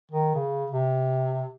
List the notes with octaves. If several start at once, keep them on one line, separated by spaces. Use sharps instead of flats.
D#3
C#3
C3